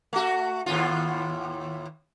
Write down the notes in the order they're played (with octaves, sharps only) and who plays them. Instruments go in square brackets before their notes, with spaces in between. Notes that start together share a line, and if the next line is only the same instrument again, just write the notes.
[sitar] A3 F#4
D#2 A2 F4